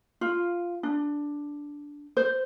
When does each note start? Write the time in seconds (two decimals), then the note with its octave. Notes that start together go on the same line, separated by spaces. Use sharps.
0.21 F4
0.83 D4
2.17 C5